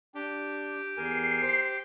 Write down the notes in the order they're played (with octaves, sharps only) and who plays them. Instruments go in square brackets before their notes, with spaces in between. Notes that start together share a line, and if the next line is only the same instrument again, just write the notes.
[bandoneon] D4 [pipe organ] G4
[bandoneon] E2 A#4 G#5 [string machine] C7
[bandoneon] C5